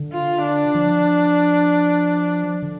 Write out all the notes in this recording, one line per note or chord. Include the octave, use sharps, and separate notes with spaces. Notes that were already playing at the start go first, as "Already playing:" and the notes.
Already playing: D3
F4
D4
F3
D3